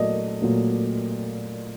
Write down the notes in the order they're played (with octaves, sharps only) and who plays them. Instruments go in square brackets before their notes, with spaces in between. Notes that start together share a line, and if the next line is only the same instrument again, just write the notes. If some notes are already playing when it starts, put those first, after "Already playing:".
Already playing: [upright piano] A#2 F#3 A3 D5 D#5
A#2 F#3 A3